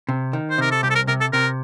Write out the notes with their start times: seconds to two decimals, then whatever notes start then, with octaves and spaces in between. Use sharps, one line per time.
0.09 C3
0.33 D#3
0.50 C5
0.58 C3 A#4
0.71 A4
0.83 C2 G4
0.90 A4
0.95 A#4
1.07 C3 A#4
1.20 A4
1.33 C3 A#4